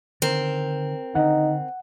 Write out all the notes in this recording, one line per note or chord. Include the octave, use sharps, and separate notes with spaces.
D3 D#3 C4 A#4
D3 D#3 D#4 F#5